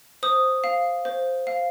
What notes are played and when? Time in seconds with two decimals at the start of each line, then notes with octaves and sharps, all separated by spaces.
0.23 C5 D#6
0.64 F5
1.05 C5
1.47 F5